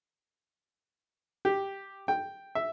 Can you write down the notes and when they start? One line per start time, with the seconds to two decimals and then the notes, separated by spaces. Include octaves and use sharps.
1.45 G4
2.08 G5
2.55 E5